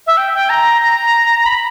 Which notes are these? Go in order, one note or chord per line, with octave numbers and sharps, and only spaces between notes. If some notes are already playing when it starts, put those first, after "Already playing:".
E5
G5
G5
A#5
A#5
B5